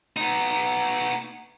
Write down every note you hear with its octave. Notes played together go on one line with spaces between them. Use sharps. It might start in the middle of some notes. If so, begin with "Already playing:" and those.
B3 D#4